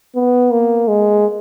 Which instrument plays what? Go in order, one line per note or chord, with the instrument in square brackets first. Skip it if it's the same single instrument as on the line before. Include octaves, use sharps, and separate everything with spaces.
[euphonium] B3
A#3
G#3